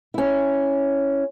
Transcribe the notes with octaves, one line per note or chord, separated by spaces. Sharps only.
C#4 E4